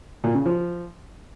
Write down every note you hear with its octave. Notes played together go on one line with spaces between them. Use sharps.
A#2
C#3
F3